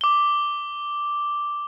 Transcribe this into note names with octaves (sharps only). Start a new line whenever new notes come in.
D6 G7